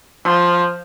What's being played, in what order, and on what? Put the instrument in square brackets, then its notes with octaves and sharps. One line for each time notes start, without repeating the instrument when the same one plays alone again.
[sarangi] F3